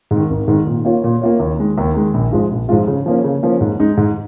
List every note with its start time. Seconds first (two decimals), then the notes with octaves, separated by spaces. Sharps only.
0.11 G#2 D#3
0.30 G#1
0.48 G#2 D#3
0.67 A#2
0.85 A#3 F4 C#5
1.04 A#2
1.22 A#3 F4 C#5
1.40 D#2
1.59 D#3 G#3
1.78 D#2
1.95 D#3 G#3
2.14 A#1
2.32 G#2 F3 G#3 F4
2.51 A#1
2.69 G#2 F3 G#3 F4
2.87 C#3
3.06 F3 A#3 C#4
3.24 C#3
3.43 F3 A#3 C#4
3.61 G#2
3.79 G#3 D#4
3.97 G#2